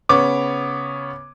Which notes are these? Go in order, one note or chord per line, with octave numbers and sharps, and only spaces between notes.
C#3 B3 C#5 D6